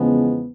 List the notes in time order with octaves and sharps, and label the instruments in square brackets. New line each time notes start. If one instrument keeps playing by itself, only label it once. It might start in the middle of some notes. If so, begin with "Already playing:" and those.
Already playing: [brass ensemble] E2 C#3 F3 G#3 B3